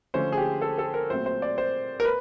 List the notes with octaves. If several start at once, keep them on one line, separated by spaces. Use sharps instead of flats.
D3 F3 A3 C#4 C5
G#4
G4
A4
A4
A#4
A#2 F#3 A3 C4 C5
C5
D5
C5
A#4
B4